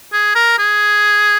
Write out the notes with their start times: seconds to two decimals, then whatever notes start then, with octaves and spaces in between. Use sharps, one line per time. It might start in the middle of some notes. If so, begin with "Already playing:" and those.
0.13 G#4
0.35 A#4
0.59 G#4